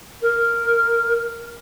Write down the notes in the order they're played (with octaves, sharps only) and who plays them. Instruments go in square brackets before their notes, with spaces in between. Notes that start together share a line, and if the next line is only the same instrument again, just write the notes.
[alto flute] A#4